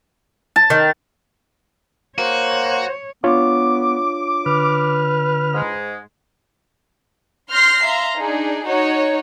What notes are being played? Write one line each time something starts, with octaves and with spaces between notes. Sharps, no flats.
A5
D#3
A#3 F#4 C5 C#5
B3 D4 F4 C#5 D6
D3 B4 F6
G#2 G#3
C6 F6 G6 A#6 C7
E5 F5 A#5 C6
D4 D#4 G#4
D#4 F#4 C#5